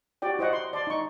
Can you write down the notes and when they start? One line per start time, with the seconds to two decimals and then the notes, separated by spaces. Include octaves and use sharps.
0.22 F#4 G4 D5 G5
0.39 E4 C5 D#5 F#5 C#6
0.53 C6
0.73 D5 A5 C6
0.87 D#4 C#6